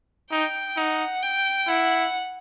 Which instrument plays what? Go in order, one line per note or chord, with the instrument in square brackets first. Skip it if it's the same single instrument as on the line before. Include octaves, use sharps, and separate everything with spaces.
[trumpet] D#4 [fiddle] G5
[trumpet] D#4 [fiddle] F#5
[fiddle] G5
[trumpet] E4 [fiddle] F#5